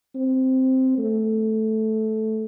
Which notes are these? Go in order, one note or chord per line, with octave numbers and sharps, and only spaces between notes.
C4
A3